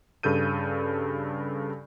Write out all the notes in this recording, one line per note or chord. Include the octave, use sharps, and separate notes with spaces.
G2 C#3 A4 G6 D#7